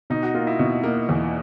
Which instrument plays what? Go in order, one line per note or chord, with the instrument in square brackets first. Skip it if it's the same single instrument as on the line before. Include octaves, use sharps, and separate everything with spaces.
[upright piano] B2 [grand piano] D#4
[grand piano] F#4
[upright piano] A#3 [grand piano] F4
[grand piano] E4
[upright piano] B2
A#3
E2